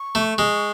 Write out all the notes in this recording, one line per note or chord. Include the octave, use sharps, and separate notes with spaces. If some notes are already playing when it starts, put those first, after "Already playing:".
Already playing: C#6
A3
G#3